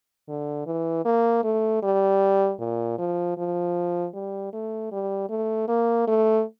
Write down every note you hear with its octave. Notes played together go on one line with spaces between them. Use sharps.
D3
E3
A#3
A3
G3
A#2
F3
F3
G3
A3
G3
A3
A#3
A3